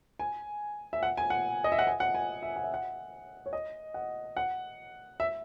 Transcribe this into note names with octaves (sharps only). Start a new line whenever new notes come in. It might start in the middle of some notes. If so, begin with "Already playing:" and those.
G#5
E5
F#5
G#5
F#5
D#5
E5
F#5
G#5
F#5
G#5
E5
F#5
E5
F#5
C#5
D#5
F#5
F#5
E5